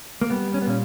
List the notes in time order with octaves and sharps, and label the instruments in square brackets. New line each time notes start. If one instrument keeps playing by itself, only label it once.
[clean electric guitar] A#3
G3 B3
C#4
B3
A#2 C#4